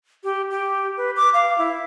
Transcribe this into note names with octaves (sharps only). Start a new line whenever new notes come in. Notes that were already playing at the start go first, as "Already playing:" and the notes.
G4
G4
B4
D6
F5
E4